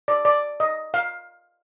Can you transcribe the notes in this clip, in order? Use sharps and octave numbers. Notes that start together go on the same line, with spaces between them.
D5
D5
D#5
F5